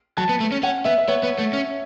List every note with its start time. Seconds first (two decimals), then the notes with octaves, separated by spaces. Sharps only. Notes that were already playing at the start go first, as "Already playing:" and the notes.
0.17 F#3 A5
0.29 B3
0.40 A3
0.52 C#4
0.63 C#4 F#5
0.85 B3 E5
0.98 E5
1.08 B3 C#5
1.23 B3
1.39 A3
1.53 C#4